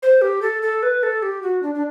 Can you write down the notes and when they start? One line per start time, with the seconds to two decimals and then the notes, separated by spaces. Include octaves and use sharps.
0.03 C5
0.22 G4
0.42 A4
0.62 A4
0.83 B4
1.03 A4
1.23 G4
1.43 F#4
1.63 D4
1.75 D4